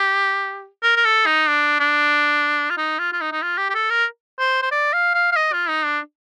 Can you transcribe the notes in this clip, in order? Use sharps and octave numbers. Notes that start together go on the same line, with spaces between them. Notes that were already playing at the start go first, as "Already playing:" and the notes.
Already playing: G4
A#4
A#4
A4
D#4
D4
D4
F4
D#4
F4
F4
D#4
D#4
F4
G4
G4
A4
A#4
C5
C5
D5
F5
F5
F5
D#5
F4
D#4
D4